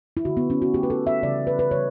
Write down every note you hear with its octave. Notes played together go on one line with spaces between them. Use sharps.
E4
D3 A3 F#4
B3
C#4
F#4
D3 A3 G4
B4
A4
E5
C#3 E3 G3 D5
B4
B4
C#3 E3 G3 C#5